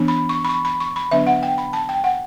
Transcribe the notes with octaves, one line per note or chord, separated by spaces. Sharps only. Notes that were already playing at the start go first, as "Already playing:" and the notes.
Already playing: E3 B3 D4
B5
C#6
B5
C#6
B5
C#6
B5
D3 F#3 B3 D4 E5
F#5
G5
B5
A5
G5
F#5